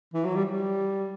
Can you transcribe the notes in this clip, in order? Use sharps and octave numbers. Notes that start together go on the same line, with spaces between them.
E3
F#3
G3
G3